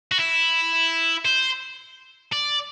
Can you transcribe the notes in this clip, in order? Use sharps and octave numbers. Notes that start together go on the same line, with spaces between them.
F#4
E4
C5
D5